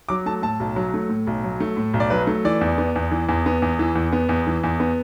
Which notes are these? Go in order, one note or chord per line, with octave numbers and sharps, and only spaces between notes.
F#3 D6
A3 A5
A2 A5
B1
F#3
A3
A2
B1
F#3
A3
A2
B1
D5
F#3 B4
A3
E3 D5
E2
B3
E2
E3
E2
B3
E2
E3
E2
B3
E2
E3
E2
B3